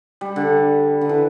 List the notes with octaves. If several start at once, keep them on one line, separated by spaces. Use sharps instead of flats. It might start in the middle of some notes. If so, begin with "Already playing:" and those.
G3
D3
D3
E3